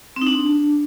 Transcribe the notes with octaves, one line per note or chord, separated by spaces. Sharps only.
C4
D#4
D4